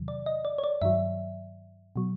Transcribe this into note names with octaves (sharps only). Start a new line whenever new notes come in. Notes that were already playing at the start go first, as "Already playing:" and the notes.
Already playing: E2 C3 D#3 F#3
D5
D#5
D5
C#5
D5
G2 D#3 F#3 E5
B2 F#3